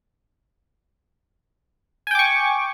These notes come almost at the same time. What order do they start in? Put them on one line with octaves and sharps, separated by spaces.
G#5 G5 D6 C#6